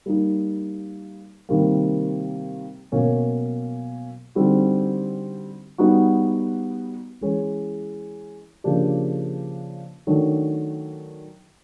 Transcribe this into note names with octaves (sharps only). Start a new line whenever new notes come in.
G3 A#3 D#4
C3 D#3 G3 A#3
B2 F#3 A#3 C#4
D3 G3 C4 D#4 F#4
G3 B3 D#4 F#4
E3 G#3 C#4 E4
C#3 F3 A#3 D4 G4
D#3 F#3 A3 D4